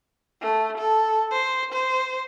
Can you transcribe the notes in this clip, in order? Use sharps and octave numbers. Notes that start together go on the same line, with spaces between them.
A3
A4
C5
C5